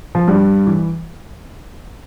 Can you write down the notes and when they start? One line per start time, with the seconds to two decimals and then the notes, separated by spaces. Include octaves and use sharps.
0.15 F3
0.28 G2 G3
0.67 E3